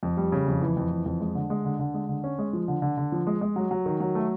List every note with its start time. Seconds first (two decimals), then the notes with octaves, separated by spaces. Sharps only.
0.03 F2
0.17 G3
0.32 C#3
0.47 F2
0.61 E3
0.77 F2
0.91 E3
1.06 F2
1.20 G#3
1.35 D3
1.50 G#3
1.65 D3
1.79 D3
1.94 G#3
2.09 D3
2.24 C#4
2.39 G#3
2.53 F3
2.68 D3
2.82 D3
2.97 D3
3.12 F3
3.27 G#3
3.41 G#3
3.56 F#3
3.71 F#3
3.86 D#3
4.00 F#3
4.15 A3